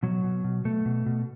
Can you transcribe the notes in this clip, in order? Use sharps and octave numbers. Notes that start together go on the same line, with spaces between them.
B2 F#3
B2
B2
B2 A3
B2
B2